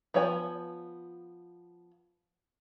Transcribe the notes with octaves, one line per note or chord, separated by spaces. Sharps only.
F3 B3 C#5 G#5